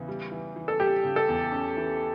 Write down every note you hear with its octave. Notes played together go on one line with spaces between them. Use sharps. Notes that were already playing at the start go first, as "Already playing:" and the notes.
Already playing: E2 C#3 E3
G3
E3
E3
A4
G3 G4
C#3
A4
E2
C#4
E3